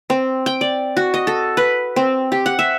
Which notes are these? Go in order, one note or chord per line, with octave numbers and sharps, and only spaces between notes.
C4
G5
D5
F#4
D#5
A4
B4
C4
G4
F#5
E5